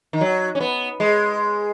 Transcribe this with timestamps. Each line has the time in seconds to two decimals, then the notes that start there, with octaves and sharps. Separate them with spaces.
0.13 D#3
0.21 F#3
0.55 C#4
0.60 B3
1.00 G#3